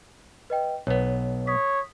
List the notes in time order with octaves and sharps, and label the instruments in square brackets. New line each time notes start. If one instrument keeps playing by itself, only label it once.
[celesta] B4 D#5 G5
[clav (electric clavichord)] B1 B3 [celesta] C#5
[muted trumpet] C#5 [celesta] D#6 B6